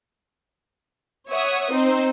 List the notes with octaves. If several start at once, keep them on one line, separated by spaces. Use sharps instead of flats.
C#5 E5 F#5 D#6
C4 D#4 C5